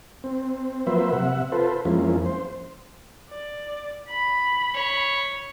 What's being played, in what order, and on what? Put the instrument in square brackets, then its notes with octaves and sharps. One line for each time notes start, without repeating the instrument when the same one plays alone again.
[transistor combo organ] C4
F3 F#3 A#3 B4 C5 E5
C3 E5 F#5
F4 A4 B4 C5
F2 F3 G#3 A#3 C#4 E4
C5
[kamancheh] D5
B5
[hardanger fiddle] C#5